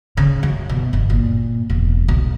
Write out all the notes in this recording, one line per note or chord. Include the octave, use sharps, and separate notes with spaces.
C#3
F#2
B2
G1
A#2
E1
B1